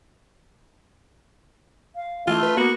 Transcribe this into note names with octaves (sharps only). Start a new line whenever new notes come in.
F5
E3 A3 F4
B4
A#3 B3 F#4